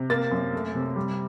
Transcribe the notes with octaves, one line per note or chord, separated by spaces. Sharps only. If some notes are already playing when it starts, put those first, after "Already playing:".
Already playing: C3
A#3 A6
F#2
A3
C3
G3